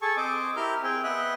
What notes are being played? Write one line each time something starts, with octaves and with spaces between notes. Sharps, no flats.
G#4 A4 A5 C#6
C4 C5 D#5 D6
E4 G4 A#4 F6 G6
C4 G#4 G5
B3 D#5 E5 G5 F#6